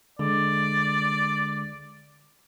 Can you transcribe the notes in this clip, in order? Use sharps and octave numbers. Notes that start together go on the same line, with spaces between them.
D3 G#3 D5